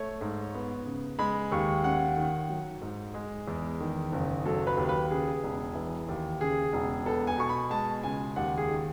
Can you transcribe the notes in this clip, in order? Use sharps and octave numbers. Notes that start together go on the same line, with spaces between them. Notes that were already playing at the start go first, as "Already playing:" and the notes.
Already playing: A3 C#5
G#2
B3
C#3
G#3 B5
D#2 C#6
C#4 F#5
D#3
F#3
G#2
G#3
E2
D#3
F#1
F#3 A4
B4
D#2
B4
C#3 G#4
E1
E3
D#2
C#3 G#4
E1
B3 A4
G#5
B2 C#6
B5
G#3 A5
C#2 G#5
D#2 F#5
G#4
D#3